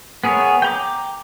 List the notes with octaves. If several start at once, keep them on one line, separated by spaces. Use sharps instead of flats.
B3 G#4 A#4 C#5
G5 A#5 D6